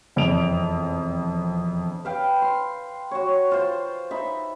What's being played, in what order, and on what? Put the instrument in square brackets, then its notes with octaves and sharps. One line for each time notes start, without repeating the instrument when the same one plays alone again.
[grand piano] E1 F2 D5 D7 F7
[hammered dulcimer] B4 F5 G5
C6
F#4 C#5
F4 C5
D#4 E5 B5